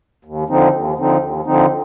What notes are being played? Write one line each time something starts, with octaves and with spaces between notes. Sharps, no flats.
D#2
D3 F3 C4 D#4
D#2
D3 F3 C4 D#4
D#2
D3 F3 C4 D#4